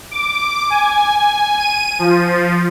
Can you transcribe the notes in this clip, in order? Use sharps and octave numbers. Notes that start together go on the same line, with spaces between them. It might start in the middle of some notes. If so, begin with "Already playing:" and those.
D6
G#5
G#5
D#7
F3